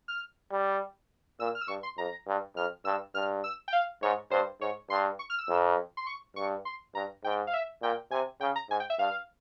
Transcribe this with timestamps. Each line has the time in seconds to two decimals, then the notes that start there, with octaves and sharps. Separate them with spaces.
0.08 F6
0.52 G3
1.40 A#2 E6
1.55 F6
1.61 E6
1.68 G2 C#6
1.83 C6
1.98 F2 A#5
2.28 G2
2.56 F2 F6
2.85 G2 E6
3.15 G2 F6
3.44 E6
3.68 G5
3.73 F5
4.03 G#2 C#5
4.31 G2 C5
4.61 G#2 C#5
4.90 G2 C6
5.19 C#6
5.30 F6
5.38 E6
5.49 F2
5.97 C6
6.07 C#6
6.36 G2 C#6
6.65 C6
6.95 G2 A#5
7.24 G#2 G5
7.47 F5
7.53 E5
7.83 A#2 G5
8.11 C3 G#5
8.41 C#3 G5
8.56 A#5
8.70 G#2 G#5
8.80 G5
8.90 E5
8.99 G2 F5